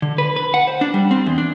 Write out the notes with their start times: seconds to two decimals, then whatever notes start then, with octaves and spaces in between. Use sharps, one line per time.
0.02 D3
0.18 B4
0.36 B4
0.54 F#5
0.67 C5
0.81 D4
0.94 G3
1.11 C4
1.26 E2
1.38 D4